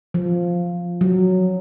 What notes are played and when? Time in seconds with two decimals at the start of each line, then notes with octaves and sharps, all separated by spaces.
0.14 F3
1.01 F#3